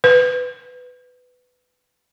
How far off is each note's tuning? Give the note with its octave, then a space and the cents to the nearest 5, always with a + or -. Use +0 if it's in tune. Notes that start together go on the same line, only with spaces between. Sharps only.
B4 +15